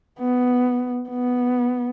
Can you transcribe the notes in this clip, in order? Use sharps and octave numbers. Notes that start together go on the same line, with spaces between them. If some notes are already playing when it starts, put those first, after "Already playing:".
B3
B3